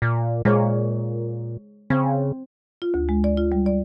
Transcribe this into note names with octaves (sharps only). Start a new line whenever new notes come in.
A#2
A#2 G#3 C5 C#5
C#3 C4
F4
D2
G#3
D5
F4
G3
D5